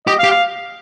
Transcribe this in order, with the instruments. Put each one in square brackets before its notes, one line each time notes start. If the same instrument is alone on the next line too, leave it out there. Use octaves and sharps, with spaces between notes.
[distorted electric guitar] G4 [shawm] D#5
[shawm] F5
[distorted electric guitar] G4
[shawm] F5